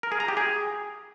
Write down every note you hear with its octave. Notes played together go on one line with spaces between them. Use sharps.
A#4
G#4
A#5
G4
G#4